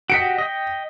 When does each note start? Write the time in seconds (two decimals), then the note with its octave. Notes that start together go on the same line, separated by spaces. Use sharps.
0.10 F#4 G4 D#5 B6 C#7 D7
0.38 D#5 G5